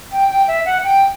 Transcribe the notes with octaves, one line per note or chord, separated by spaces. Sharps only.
G5
G5
E5
F#5
G5